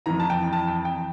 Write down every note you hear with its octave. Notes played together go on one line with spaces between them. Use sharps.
F2 E3 A#5
A5
G5
A5
G5
G5